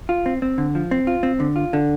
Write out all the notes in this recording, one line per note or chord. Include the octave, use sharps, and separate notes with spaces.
F4
C4
C4
D3
F3
C4
F4
C4
D3
F4
D3